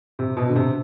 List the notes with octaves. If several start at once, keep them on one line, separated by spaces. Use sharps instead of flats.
C3
B2
D3
C3